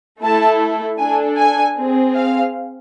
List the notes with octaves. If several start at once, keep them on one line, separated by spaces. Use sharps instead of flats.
A3 E4 A4 A5
D4 A4 G#5
G#5
C4 G#4
F5